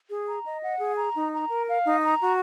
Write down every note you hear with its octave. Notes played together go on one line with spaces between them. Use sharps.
G#4
A#5
D#5
F#5
G#4
A#5
D#4
A#5
A#4
F5
D#4
A#5
F#4